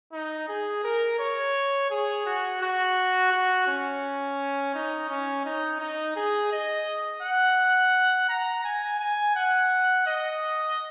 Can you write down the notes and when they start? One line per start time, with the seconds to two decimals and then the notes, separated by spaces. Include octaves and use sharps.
0.13 D#4
0.48 G#4
0.84 A#4
1.19 C#5
1.90 G#4
2.26 F#4
2.61 F#4
3.32 F#4
3.67 C#4
4.74 D#4
5.10 C#4
5.45 D#4
5.80 D#4
6.16 G#4
6.52 D#5
7.22 F#5
8.29 A#5
8.64 G#5
9.00 G#5
9.36 F#5
10.06 D#5